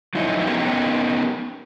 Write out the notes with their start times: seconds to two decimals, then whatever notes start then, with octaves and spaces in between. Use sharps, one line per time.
0.15 F3 F#3 D#4 E4
0.47 B3 C#4 D#4 G4 A#4